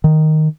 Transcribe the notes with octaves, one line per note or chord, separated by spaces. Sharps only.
D#3